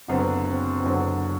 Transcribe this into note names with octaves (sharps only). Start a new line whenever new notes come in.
F#1 F#2 D3 F#3 B3 C4
C4
F#1 F#2 D3 F#3 B3